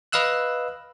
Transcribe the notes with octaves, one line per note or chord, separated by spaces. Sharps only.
B4 D#5 F5 E6 F#6